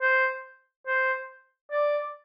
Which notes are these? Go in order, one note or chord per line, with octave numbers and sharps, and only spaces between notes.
C5
C5
D5